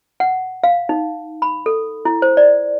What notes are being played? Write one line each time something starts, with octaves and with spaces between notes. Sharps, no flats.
F#5
F5
D#4
B5
A4
E4
C5
D5